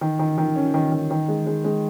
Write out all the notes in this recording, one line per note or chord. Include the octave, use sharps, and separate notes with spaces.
D#3
D#3
D#3
C#4
D#3
D#3
D#3
G#3
G#3
G#3